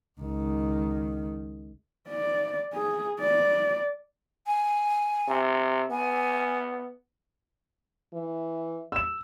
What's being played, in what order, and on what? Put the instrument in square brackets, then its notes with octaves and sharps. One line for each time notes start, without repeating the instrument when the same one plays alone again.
[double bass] C#2 D#3
[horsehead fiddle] D5
G#4
D5
[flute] G#5
[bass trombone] C3
[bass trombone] B3 [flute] G#5
[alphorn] E3
[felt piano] E6 E7